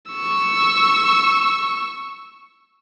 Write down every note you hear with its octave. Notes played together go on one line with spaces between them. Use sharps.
C#6 E6